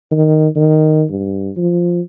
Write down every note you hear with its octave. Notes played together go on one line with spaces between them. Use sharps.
D#3
D#3
G2
F3